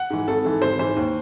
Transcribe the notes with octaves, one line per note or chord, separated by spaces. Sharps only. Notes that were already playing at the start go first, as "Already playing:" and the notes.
Already playing: F#5
G#2 E3
G#1 A4
G#2 E3
G#1 C5
G#2 E3 C5
D#2